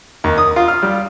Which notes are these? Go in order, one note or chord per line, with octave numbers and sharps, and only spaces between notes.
D#2
D#6
F4
F6
G3